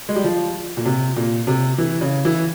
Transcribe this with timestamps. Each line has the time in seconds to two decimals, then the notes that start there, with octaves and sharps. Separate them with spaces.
0.09 G#3
0.16 G3
0.24 F3
0.77 A#2
0.86 C3
1.16 A#2
1.47 C3
1.78 E3
2.01 C#3
2.25 E3